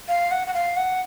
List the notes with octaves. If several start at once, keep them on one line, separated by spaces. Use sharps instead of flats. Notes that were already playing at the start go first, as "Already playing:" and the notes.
F5
F#5
F#5
F5
F#5